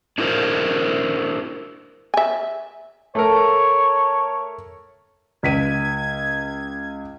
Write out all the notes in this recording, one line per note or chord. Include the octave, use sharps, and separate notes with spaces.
D4 E4 F#4 A#4 C5
E5 G#5
A3 A4 A#4 C#5
C#2 G#6 B6 D#7